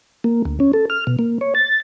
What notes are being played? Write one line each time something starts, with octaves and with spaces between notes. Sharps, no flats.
A#3
D2
C#4
A4
F6
B2
A#3
C#5
A6